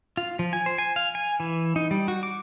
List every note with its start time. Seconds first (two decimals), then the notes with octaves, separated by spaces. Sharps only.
0.17 F4
0.39 F3
0.53 G#5
0.66 C5
0.78 G#5
0.96 F5
1.15 G#5
1.40 E3
1.76 D#4
1.91 G3
2.08 F#4
2.23 D6